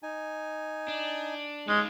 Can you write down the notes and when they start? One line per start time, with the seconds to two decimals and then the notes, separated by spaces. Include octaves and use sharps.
0.03 D#4 G#5
0.88 D4
1.68 G#3 C#4 D#4 F5